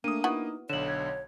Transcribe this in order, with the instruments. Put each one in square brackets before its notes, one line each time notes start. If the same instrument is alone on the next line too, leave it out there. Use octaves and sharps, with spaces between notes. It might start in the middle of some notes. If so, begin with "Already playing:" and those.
[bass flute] A3 [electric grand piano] A#3 D#6 [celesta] D4 D#7
[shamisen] B3 E4 F#4 [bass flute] D#4
[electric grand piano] B1 D3 [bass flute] C#5 [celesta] E7 F#7
[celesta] G#6